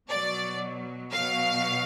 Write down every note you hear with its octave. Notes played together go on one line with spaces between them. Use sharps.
B2 F#3 D5
B2 F#3 F5